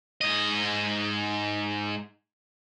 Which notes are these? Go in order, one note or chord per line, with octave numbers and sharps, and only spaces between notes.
G#2 D#5